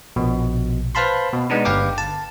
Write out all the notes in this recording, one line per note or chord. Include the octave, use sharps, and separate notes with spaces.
A#1 B2
B4 C5 F5 A5 B5 C6
B2
G#3 B3 D4 D#4
G1 B4 F5 G5 D6
A5